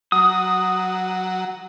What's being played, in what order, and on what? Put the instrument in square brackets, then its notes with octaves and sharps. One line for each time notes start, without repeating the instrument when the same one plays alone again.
[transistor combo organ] F#3 [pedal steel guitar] D#6